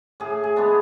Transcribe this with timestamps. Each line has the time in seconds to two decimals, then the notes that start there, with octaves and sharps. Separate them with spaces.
0.20 A2 G#4
0.44 G#4
0.56 G#3 B3 D4